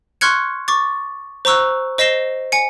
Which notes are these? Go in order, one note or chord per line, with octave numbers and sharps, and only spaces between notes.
C6 C#6 F6 F#6 G#6 C#7
C#6 D6 A6
C5 A#5 C#6 E6 F#6
C5 D#5 A#6 C7 E7 G7
G#5 C#7